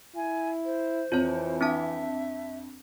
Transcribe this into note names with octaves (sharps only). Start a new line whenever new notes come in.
E4 G#5
C5
F2 E3 F4 C#5
C4 D4 E5 A5